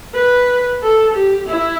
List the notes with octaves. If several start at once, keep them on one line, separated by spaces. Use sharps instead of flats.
B4
A4
G4
E4